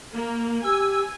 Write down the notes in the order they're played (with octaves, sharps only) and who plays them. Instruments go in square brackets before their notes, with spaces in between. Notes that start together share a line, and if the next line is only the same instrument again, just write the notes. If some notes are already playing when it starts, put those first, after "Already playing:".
[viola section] A#3
[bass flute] G4 [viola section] G#5 [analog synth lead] E6